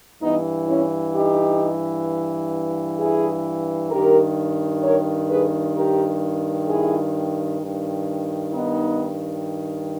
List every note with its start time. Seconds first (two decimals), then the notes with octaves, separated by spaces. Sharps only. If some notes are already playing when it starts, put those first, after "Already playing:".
0.22 G2 E3 B3 D#4
0.68 C#4 E4
1.14 D#4 G4
2.99 E4 G#4
3.91 G2 D#3 G4 A#4
4.83 A#4 C#5
5.30 G#4 B4
5.75 G4 A#4
6.68 E4 G#4
7.61 G2 D#3
8.53 B3 D#4